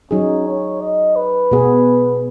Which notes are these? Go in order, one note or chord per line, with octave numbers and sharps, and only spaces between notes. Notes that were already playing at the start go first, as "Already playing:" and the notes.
F#3 C#4 D#4 G#4
C#5
D#5
B4
B2 B3 G#4